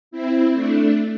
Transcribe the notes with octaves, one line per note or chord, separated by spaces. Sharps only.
C4 E4
A3 D4